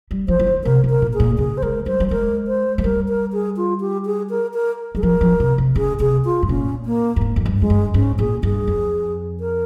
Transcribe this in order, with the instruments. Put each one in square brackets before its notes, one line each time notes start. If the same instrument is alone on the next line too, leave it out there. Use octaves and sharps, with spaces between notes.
[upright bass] G3
[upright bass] F3 [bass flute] C5
[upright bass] F3
D#3
[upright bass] C3 [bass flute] A#4
[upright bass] C3
[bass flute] A#4
[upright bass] A#2
[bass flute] G#4
[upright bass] A#2
[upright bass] C#3 [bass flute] G#4
[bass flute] C5
[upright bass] G#3 [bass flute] A#4
[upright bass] G3 [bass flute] C5
[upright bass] G3
[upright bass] G#3 [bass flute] A#4
[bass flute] C5
[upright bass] G#3
[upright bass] G3 [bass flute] A#4
[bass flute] A#4
G#4
F4
G4
G#4
A#4
A#4
[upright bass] G3 [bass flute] G#4
[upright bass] F3 [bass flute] A#4
[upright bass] F3
C3
C3
[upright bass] C#3 [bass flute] G#4
[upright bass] C3 [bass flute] G#4
[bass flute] F4
[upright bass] G#2
[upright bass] A#2 [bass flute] C#4
[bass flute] A#3
[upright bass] G2
G#2
F2
G2
[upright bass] F2 [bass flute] G#3
[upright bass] G2
[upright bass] G#2 [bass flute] C#4
[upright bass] A#2 [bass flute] G#4
[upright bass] G2 [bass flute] G#4
[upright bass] F2
[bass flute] A#4